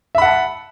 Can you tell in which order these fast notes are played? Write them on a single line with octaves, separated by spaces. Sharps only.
E5 B5 F#5 A5